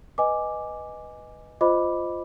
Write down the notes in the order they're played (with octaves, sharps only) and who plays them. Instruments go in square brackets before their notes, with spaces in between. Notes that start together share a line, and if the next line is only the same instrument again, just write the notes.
[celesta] B4 D#5 G#5 D6
F4 C5 D#5 B5 D6